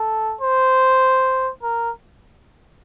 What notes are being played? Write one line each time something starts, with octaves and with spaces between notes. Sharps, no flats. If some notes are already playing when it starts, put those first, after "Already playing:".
Already playing: A4
C5
A#4